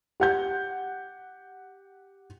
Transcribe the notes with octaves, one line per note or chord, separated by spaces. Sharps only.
G4 F#5 G6